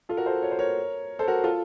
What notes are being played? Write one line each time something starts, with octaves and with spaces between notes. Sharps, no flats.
F4 A4
F#4 A#4
A4 C5
C#5
C5
A#4 C#5
A4 C5
F#4 A#4
F4 A4